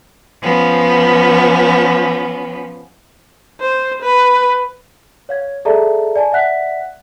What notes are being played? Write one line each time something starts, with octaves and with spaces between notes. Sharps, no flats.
F3 B3 C#4
C5
B4
C#5 F5 G#6
G#4 A4 D5 E5 A5 A#5
D5 G#5 A5
D5 E5 F#5 F#6 B6